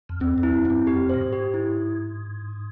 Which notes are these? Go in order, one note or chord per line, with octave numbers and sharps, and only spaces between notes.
F2
E2 C4
E2
E4
F2
G2 C4
F2 G4
A#2 C5
G#2
G4
E4